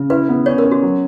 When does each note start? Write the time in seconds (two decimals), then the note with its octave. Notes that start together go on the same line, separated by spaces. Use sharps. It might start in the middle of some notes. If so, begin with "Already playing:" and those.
Already playing: C#3
0.10 E4 B4
0.29 B3
0.46 C#4 C#5
0.58 A#4
0.65 C#4
0.71 F#4
0.82 F#3